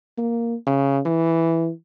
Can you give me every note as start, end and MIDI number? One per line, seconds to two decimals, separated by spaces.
0.18 0.55 58
0.66 0.99 49
1.05 1.70 52